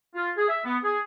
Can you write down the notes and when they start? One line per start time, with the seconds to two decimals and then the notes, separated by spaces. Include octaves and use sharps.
0.15 F4
0.37 G#4
0.49 E5
0.65 B3
0.83 G#4